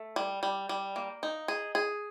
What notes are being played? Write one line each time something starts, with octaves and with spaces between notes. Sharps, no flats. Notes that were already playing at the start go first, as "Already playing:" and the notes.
Already playing: A3
G3
G3
G3
A#3
D#4
G#4
G#4